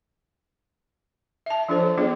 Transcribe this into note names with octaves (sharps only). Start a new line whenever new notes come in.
E5 A5
F3 D4 F4 A4 C5
C#5
F#3 B3 D4 F4 G#4 C#5